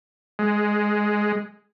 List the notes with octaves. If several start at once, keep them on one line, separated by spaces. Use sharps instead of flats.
G#3